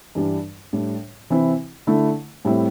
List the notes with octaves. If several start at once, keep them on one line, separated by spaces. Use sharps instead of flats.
G2 E3 G3 D4
A2 G3 D4
C3 E3 C4 E4
D3 A3 E4
A2 G3 C4 E4